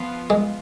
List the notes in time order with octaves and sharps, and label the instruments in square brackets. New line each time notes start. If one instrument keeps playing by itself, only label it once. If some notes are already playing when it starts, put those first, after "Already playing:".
Already playing: [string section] F3 B3 F4
[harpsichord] G#3